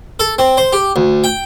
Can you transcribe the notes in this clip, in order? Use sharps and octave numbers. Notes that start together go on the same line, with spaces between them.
A4
C4
C5
G4
D2
G5